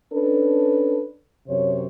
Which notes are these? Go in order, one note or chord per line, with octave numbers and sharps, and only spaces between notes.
C#4 D4 A4 B4
F#2 C3 C5 C#5